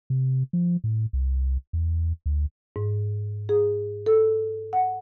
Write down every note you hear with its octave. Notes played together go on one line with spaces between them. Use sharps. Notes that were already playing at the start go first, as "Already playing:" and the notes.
C3
F3
A2
C2
E2
D2
G#2
G#4
A4
F#5